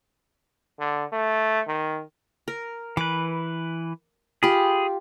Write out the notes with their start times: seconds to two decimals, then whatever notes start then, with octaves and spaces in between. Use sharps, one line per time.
0.80 D3
1.12 A3
1.68 D#3
2.48 A#4
2.97 E3 B4 D6
4.43 F4 G4 G#4 B5